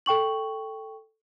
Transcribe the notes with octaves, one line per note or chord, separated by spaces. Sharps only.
A4 G5 C#6 F#7